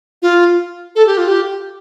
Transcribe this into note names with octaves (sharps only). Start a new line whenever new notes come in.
F4
A4
G4
F4
G4